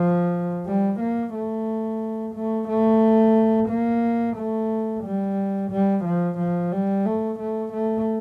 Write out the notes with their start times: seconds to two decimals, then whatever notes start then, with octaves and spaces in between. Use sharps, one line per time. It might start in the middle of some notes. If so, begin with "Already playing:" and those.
Already playing: F3
0.66 G3
1.00 A#3
1.34 A3
2.35 A3
2.69 A3
3.69 A#3
4.37 A3
5.04 G3
5.71 G3
6.05 F3
6.38 F3
6.72 G3
7.06 A3
7.39 A3
7.73 A3